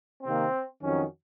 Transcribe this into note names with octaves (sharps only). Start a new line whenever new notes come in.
C3 D#3 A#3 C4
F2 D#3 F#3 C#4